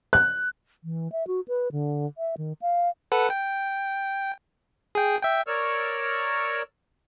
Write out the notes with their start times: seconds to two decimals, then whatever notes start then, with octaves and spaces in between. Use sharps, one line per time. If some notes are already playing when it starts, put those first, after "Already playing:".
0.13 F#6
0.84 E3
1.12 E5
1.27 F#4
1.48 B4
1.72 D3
2.18 E5
2.38 D#3
2.62 F5
3.12 A4 B4 F#5
3.30 G5
4.95 G#4 G5
5.23 E5 G5
5.47 A#4 C#5 D5 C#6 E6 F6